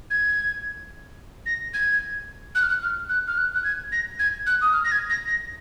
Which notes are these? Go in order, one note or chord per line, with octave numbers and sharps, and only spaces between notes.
G#6
A#6
G#6
F#6
F6
F#6
F6
F#6
F6
F#6
F#6
G#6
A#6
G#6
F#6
D#6
F6
A#6
G#6
A#6
A#6